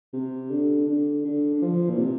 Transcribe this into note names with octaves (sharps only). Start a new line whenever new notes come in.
C3
D3
D3
D3
D3
F3
A#2
C3